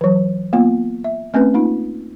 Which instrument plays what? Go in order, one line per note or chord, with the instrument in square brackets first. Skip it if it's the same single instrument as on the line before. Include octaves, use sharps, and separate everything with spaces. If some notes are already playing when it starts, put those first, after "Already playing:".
[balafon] E3 F#3
A#3 B3 F4
E5
A3 C4 C#4 B4
A#3 D#4 F4